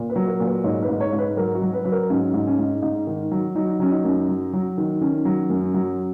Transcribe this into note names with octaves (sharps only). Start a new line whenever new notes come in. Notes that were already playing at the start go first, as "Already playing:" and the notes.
Already playing: A#2
B4
F#3
A#4
A#2
B4
G#2 C#5
B4
G#2
C#5
G#2
B4
F#3 A#4
F#4
F#3
B4
F#3 B4
A#4
G#2 C#4
G#2
C#4
G#2
G#2 D#4
D#3
F#3
F#3 D#4
F#3 C#4
D#4
F#2
F#3
F#3
D#3
D#3 C#4
F#3
F#2
F#3